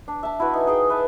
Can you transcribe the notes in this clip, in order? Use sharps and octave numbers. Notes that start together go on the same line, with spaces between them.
D4
E5 A5
E4 F#4 B4
D#4 G#5
D#4 G#4 G5
B4 E5 A5